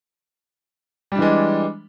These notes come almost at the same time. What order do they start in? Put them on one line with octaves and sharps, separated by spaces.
G3 D4 E3 G#3